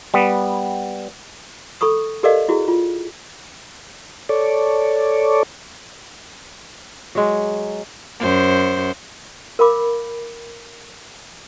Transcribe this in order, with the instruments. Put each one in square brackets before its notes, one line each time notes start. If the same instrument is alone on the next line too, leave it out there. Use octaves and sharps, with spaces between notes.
[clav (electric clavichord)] G3 B3
[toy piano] A4 B5 C#6 D#6
G4 A4 A#4 D5 D#5 F5
E4 F#4 G#4
F4
[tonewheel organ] A4 C#5 D5
[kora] F#3 G#3
[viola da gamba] F#2 C5
[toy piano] A#4 F5 B5 D6